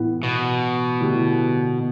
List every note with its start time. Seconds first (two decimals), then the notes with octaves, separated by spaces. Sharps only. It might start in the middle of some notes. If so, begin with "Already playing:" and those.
Already playing: A2 E3 B3 E4
0.23 B2
1.00 D3 A3 E4 G4